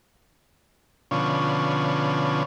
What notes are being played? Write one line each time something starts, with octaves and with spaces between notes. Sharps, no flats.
B2 D3 F3 C#4